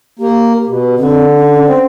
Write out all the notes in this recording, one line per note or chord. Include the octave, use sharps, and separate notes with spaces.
A#3 G4
B2
D3 C4
C#4
C4 C#4